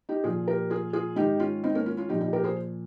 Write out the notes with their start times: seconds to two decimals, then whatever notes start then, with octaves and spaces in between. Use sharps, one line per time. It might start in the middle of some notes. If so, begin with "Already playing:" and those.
0.09 D#4 G4
0.24 A#2 F3 F4 G#4
0.48 G4 A#4
0.70 F4 G#4
0.93 F4 G#4
1.16 G#2 D#3 D#4 G4
1.40 C#4 F4
1.64 C4 D#4
1.75 A#3 C#4
1.86 C#4 F4
1.97 C#4 F4
2.09 A#2 F3 D#4 G4
2.21 D#4 G4
2.33 G4 A#4
2.43 G#4 C5